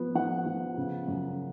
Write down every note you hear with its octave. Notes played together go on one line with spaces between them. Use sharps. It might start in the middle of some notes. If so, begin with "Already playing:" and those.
Already playing: F3 B3
F3 F#5
F3
C#3
F#2